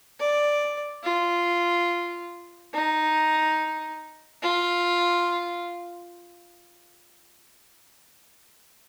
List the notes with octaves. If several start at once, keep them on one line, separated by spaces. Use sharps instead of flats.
D5
F4
D#4
F4